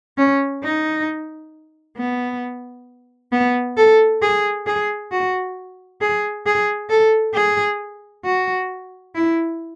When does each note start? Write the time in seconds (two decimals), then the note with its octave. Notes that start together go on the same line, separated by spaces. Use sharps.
0.18 C#4
0.63 D#4
1.97 B3
3.32 B3
3.77 A4
4.22 G#4
4.66 G#4
5.12 F#4
6.01 G#4
6.46 G#4
6.90 A4
7.35 G#4
8.24 F#4
9.15 E4